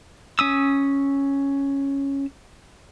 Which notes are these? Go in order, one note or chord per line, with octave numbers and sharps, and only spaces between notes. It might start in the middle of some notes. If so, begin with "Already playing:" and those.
C#4 D#6 E6